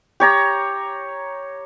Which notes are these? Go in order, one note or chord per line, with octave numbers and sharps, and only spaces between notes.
G4 C#5 A#5